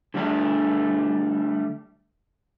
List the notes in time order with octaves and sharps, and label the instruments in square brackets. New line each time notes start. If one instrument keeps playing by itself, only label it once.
[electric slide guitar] D3 G3 A3 D4